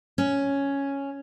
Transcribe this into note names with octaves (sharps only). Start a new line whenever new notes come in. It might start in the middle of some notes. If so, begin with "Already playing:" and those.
C#4